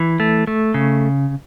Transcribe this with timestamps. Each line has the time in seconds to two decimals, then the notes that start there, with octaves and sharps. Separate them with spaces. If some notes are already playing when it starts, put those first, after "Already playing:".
Already playing: E3
0.20 A3
0.47 A3
0.74 C#3